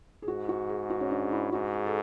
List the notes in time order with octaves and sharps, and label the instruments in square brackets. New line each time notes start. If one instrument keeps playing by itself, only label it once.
[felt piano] G#4
[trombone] G#2 [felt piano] F#4
[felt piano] F#4
G#4
F#4
C#4
D4
E4
[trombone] G#2 [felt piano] F#4
[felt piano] G#4
A4